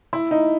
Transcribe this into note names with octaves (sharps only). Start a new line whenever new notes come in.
E4
D#4